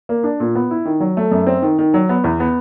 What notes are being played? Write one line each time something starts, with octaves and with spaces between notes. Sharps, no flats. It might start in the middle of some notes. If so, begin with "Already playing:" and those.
A#3
D4
A#2
B3
E4
D#3
F#3
A3
F#2
C4
D#3
D#3
F#3
B3
E2
B3